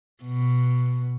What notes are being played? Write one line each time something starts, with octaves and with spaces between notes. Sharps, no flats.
B2